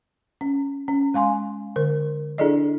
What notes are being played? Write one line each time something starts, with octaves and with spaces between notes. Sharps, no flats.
C#4
C#4
G#3 F5 G#5 C6
D3 A#4
D4 E4 G#4 A4 D5 D#5